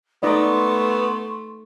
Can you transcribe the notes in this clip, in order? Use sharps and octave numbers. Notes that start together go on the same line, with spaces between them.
A3 B3 D#4 D5 D#5 C6 C#6